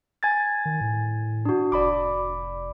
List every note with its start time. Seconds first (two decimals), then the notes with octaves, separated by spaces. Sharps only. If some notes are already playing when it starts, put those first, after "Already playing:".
0.23 G#5 G#6 A6
0.65 D#3
0.81 A2
1.45 D4 F#4
1.72 F1 D5 B5 D6